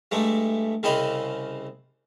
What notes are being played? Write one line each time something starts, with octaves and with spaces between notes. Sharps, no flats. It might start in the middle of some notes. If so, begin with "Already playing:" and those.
G2 G#3 A3
C2 C#3 C4 D#5 B5 C6